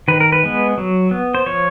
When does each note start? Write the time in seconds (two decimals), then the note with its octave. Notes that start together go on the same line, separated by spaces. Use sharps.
0.08 D#3 B4
0.20 A#4
0.32 B4
0.43 G#3 B3
0.78 F#3
1.11 B3
1.35 C5
1.46 F3 C#5